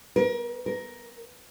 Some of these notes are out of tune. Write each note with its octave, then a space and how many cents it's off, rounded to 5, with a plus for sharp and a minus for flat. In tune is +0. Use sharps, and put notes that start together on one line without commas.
A#4 +35
A#4 +10